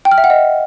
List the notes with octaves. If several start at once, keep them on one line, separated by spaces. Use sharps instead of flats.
G5
F6
E5
F#5
D#5